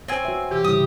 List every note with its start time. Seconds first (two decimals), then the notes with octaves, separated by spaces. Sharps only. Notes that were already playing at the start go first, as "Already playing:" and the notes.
0.08 C4 C5 C#5 G#5
0.25 F#4 B4 C#5 E5
0.51 C3 E3 G4
0.64 G#2 C#3 G3 E4 D#6